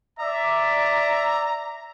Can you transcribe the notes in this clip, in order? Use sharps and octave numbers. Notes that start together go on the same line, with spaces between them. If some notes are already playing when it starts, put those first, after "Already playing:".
D5 E5 A#5